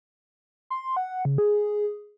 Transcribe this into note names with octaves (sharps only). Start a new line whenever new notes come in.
C6
F#5
C#3
G#4